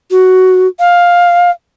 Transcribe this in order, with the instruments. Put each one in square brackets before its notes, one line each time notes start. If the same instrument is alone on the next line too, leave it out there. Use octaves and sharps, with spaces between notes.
[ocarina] F#4
F5